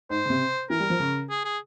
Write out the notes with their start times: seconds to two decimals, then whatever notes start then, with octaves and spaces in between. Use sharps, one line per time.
0.10 G#2 C5
0.25 C#3
0.30 C3
0.70 E3 A#4
0.80 G3
0.90 F3
1.00 C#3
1.29 G#4
1.45 G#4